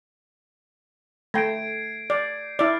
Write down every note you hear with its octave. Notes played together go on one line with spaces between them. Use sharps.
A3 G5 G#6 C7 D7
D5 G6 C7
E4 D5 F6 C7 D7